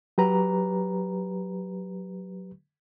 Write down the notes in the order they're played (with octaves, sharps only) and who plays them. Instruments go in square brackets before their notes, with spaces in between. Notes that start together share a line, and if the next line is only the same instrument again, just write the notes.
[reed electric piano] F#3 G4 B4 A#5